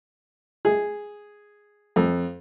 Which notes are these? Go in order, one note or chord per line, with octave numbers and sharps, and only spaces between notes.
G#4
F2